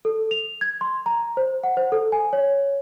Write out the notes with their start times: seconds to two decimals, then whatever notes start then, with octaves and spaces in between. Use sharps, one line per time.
0.05 A4
0.31 F7
0.61 G#6
0.81 C6
1.06 A#5
1.37 C5
1.63 F#5
1.77 C5
1.92 A4
2.12 G#5
2.33 C#5